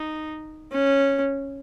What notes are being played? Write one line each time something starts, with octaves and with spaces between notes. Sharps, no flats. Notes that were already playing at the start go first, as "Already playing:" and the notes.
Already playing: D#4
C#4